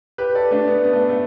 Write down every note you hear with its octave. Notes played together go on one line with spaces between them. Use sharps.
G4 B4
A4 D5
A3 D4
B3
B3
A3
A3